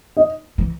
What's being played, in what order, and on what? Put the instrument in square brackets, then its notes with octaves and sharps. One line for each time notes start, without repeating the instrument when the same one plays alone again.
[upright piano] D#5
[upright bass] E3